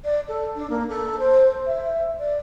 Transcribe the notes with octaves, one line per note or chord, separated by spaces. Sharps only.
D5
A4
D4
A#3
A4
C5
E5
D5